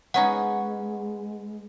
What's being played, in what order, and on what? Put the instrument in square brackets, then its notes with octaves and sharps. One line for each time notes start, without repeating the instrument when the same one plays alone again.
[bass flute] G#3 [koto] B3 C#4 D#4 [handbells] F#5